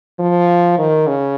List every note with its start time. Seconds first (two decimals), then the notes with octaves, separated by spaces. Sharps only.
0.19 F3
0.78 D#3
1.07 C#3